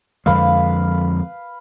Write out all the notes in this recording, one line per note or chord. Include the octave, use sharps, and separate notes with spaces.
F2 D3 G#3 B4 F5